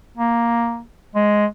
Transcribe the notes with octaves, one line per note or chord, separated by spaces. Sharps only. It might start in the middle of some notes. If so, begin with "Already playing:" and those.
A#3
G#3